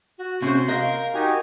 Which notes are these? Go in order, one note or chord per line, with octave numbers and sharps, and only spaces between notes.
F#4
C3 C#4 C5 C6 G6
A#4 D#5 F5
D#4 F#4 G4 G#5